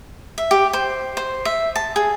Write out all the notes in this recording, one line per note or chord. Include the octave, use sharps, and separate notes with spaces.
E5
G4
C5
C5
E5
A5
G#4